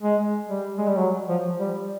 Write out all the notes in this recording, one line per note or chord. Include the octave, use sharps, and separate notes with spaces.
G#3
G3
G#3
G3
F#3
F3
G3